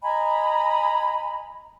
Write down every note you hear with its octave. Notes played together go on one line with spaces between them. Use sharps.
D#5 G#5 A#5 B5